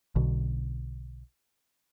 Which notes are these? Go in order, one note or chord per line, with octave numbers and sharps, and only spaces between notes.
B1 B2 D3